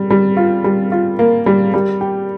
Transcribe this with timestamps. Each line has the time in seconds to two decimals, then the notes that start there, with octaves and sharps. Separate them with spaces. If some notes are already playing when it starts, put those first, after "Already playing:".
Already playing: G3
0.10 G3
0.37 F4
0.64 G3
0.92 F4
1.19 A#3
1.46 G3
1.74 G3
2.01 G4